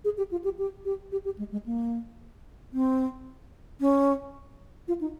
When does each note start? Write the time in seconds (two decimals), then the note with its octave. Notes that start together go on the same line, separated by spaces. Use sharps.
0.05 G#4
0.18 G4
0.31 F4
0.44 G4
0.58 G4
0.85 G4
1.12 G4
1.25 G4
1.38 G#3
1.52 G#3
1.66 A#3
2.73 C4
3.81 C#4
4.88 F4
5.01 D#4